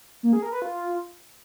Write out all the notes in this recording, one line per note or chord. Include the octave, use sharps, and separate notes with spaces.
A#3
G#4
A#4
B4
F4